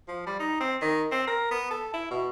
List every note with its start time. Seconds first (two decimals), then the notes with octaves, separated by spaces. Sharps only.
0.08 F3
0.26 G3
0.40 D#4
0.61 C4
0.82 D#3
1.11 C4
1.27 A#4
1.51 B3
1.71 A4
1.93 E4
2.11 B2